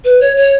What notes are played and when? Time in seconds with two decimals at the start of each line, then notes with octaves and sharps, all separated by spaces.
0.05 B4
0.21 C#5
0.37 C#5